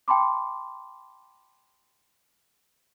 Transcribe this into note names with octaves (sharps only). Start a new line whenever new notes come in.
G5 A5 B5 C6 D6